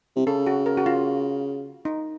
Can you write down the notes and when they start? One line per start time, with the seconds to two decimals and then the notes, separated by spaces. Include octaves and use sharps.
0.16 C3
0.26 C#3 A4
0.46 F#4
0.66 A#4
0.78 F#4
0.86 F4
1.85 D#4